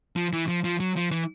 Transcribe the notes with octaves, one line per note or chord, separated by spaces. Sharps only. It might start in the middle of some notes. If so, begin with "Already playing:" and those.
F3
E3
F3
F3
F#3
F3
E3